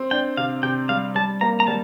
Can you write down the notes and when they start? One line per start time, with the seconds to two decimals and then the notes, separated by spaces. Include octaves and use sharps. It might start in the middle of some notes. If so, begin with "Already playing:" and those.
Already playing: C4
0.11 D4 G5
0.37 C3 F5
0.63 C3 G5
0.89 G3 F5
1.15 G3 A5
1.41 A#3 A#5
1.60 A#5
1.67 G3 A5